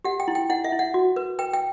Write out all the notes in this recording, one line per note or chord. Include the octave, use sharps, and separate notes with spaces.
G4 F#5
G5
E4
G5
E4 F#5
E5
E4
F#5
F#4
B4
B4 G5
G5